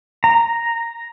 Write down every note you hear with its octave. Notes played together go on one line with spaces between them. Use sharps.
A#5